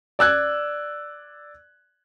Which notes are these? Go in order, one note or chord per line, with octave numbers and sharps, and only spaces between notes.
D5 E6 F#6 G#6